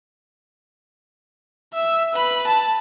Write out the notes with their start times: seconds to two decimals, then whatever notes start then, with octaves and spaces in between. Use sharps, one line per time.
1.74 E5 E6
2.14 B4 B5
2.47 A5